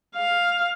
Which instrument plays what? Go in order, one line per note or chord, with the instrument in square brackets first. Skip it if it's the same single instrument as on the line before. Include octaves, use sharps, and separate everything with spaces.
[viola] F5